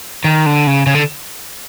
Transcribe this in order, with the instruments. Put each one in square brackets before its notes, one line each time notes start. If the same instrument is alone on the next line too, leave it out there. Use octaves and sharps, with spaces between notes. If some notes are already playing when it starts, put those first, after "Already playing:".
[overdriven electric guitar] D#3
D3
C#3
C#3
D3